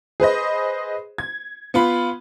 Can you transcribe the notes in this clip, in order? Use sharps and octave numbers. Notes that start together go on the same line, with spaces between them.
G#4 B4 C5 D#5
G#6
B3 F4 B5